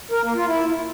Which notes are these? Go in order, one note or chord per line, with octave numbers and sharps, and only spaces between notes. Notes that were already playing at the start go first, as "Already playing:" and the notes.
A#4
A#3
F4
E4